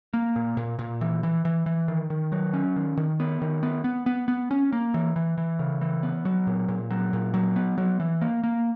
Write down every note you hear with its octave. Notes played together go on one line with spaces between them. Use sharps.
A#3
A#2
A#2
A#2
E3
E3
E3
E3
D#3
D#3
F#3
C#4
D#3
D#3
B3
D#3
B3
B3
B3
B3
C#4
A#3
E3
E3
E3
C#3
E3
B3
F#3
A#2
A#2
F#3
A#2
F#3
B3
F#3
E3
A#3
A#3